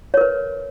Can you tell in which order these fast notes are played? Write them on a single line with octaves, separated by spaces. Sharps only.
C#5 A#4 B4